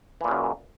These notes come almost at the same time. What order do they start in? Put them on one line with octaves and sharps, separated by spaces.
E3 A#2 C#3 F#2